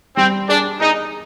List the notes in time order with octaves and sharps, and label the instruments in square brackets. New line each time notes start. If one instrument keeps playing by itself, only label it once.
[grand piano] G3 [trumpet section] C4
[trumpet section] D4 [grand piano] G#4
[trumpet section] D#4 [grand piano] G#4